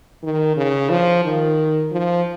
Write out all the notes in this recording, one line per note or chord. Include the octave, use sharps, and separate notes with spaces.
D#3
C#3
F3
D#3
F3